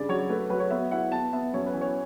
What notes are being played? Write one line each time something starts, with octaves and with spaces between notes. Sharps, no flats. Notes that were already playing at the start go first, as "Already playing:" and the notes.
Already playing: G2 C#3 D5
F#3 C#5
A3 B4
F#3 B4
C#5
B3 E5
E4 F#5
B3 A5
B3 E5
F#2 C#5
B4
E3
C#5